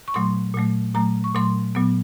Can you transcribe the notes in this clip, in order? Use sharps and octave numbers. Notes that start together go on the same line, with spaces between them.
C#6
A#2 F#3 A3 C6
A#2 F#3 A3
A#2 F#3 A3 A#5
C#6
A#2 F#3 A3 C6
A#2 F#3 B3